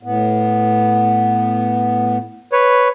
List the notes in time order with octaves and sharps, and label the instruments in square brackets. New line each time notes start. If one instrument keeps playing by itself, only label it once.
[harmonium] A2 B3
[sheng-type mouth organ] B4 C#5